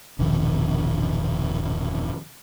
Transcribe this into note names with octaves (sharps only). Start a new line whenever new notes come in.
E1 A#1 G2 D#3